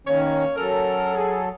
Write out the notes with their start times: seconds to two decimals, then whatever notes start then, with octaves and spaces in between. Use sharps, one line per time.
0.07 D#3 A#3 C#4 C#5
0.56 F#3 C#4 A4 A#4
1.15 G#4